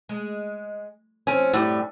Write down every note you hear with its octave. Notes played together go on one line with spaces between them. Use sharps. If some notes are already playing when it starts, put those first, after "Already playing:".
G#3
F3 C4 C#4
F#2 A2 G3 G4